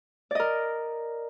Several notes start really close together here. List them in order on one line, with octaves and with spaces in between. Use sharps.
D5 D#5 A#4